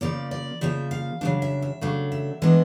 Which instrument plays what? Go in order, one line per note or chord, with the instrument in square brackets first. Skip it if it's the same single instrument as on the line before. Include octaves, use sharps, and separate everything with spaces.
[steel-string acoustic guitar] C#3 F3 A#3 D5
D5
C#3 F3 A#3 E5
F5
C#3 F#3 A3 D4 F5
E5
E5
C#3 F#3 A3 D4 F5
E5
E3 G#3 B3 D4 D#5